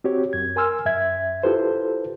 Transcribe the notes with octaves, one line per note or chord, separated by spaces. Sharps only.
C4 F#4 G4 C#5
F#2 G#6
A#4 G#5 C6 E6 F6
F#2 E5 G#6
E4 F4 G4 A4 B4 C5